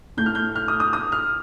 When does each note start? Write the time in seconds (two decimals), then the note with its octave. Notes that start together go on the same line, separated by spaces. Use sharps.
0.17 A2 A3 G6
0.26 F6
0.35 G6
0.56 F6
0.68 D#6
0.80 D#6
0.93 D#6
1.12 F6